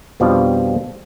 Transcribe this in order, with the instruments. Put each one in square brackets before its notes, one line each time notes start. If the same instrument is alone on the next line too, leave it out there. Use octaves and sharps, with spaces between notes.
[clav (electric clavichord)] F2 B2 F3 G3 D4 D5